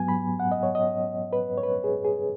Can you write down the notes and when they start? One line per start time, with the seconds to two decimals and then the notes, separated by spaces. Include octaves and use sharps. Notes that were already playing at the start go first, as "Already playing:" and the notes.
Already playing: G#2 F#3 B3 G#5
0.08 B5
0.40 F#5
0.52 D#5
0.63 C#5
0.75 D#5
1.33 B4
1.58 C#5
1.63 B4
1.84 G#4
2.04 G#4